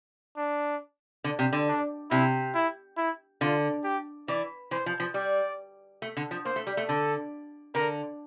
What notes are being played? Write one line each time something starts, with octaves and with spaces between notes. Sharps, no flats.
D4
D3
C3
D3
D4
C3 E4
E4
E4
D3 F4
G4
E3 D5
E3 C5
F3
F3
G3 D5
A3
D3
F3
A#3 C5
A3
G3
A3
D3 A4
D3 A#4